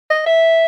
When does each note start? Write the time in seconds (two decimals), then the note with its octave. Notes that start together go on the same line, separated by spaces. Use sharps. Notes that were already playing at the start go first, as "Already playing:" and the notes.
0.10 D#5
0.26 E5